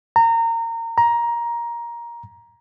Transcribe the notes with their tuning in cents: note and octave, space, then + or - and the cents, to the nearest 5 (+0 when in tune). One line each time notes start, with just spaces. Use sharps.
A#5 -25
A#5 +15